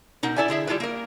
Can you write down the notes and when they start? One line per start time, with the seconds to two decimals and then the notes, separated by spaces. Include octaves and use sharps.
0.23 B2 D#4 A#4 F#5
0.36 E4 A4 D5 E5 G#5
0.48 D3 E4 G#4 E5
0.67 G3 E4 F4 A4 B4
0.80 A#3 A#4